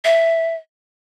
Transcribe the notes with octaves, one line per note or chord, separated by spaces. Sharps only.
E5